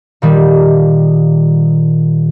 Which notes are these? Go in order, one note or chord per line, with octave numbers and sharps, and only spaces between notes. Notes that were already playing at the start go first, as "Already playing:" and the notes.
A#2 D#3 G3